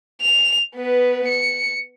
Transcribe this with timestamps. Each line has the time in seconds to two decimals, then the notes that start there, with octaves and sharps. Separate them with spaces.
0.22 F7
0.75 B3 B4
1.28 C#7